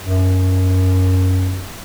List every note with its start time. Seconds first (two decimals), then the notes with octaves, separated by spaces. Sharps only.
0.05 F#2